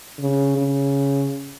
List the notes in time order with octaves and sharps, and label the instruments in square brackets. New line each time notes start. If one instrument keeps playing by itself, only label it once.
[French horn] C#3
C#3